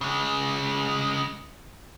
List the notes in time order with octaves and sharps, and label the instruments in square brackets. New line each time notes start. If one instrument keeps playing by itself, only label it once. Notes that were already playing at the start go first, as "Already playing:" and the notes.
[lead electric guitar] C#3 G#3